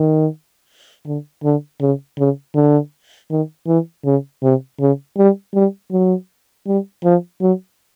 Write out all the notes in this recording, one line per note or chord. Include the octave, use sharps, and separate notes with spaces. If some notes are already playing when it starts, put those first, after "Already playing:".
Already playing: D#3
D3
D3
C#3
C#3
D3
D#3
E3
C#3
C3
C#3
G3
G3
F#3
G3
F3
F#3